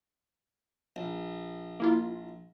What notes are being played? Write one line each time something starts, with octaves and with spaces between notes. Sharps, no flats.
A#1
A#3 E4 F4